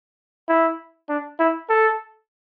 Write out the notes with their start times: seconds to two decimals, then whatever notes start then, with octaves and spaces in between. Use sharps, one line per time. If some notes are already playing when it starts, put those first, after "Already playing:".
0.49 E4
1.09 D4
1.39 E4
1.69 A4